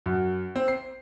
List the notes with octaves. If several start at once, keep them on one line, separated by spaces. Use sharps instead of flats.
F#2
C4
C7